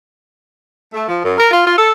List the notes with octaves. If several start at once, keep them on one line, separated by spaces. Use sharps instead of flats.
A3
F3
F#2
A#4
F4
F4
A4